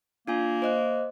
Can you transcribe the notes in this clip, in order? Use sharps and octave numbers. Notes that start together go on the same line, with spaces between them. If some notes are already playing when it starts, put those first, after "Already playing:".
A#3 D4 F4 G#5
C5 D#5 F#6